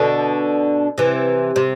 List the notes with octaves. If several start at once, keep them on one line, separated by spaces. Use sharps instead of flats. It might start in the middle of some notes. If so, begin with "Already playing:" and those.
Already playing: B2 D3
C3 E3
C3